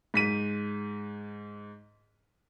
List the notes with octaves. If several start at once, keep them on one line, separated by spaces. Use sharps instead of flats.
G#2 B6 D#7